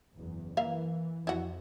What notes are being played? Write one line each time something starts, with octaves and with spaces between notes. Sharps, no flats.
F#1 E2
E3 A#3 E5 F5
F2 E4 F#4